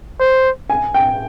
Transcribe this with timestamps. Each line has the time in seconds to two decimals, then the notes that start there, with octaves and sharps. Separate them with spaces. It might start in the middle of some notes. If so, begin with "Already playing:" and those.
0.20 C5
0.70 G#5
0.94 G5